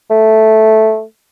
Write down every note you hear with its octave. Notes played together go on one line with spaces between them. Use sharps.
A3